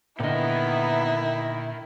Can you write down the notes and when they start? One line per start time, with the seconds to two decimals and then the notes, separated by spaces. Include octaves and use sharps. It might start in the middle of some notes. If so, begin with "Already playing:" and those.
0.20 A#2 D3 D#3 B3 E4 D#5